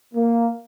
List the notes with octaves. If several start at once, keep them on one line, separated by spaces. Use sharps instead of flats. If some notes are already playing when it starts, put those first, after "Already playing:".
A#3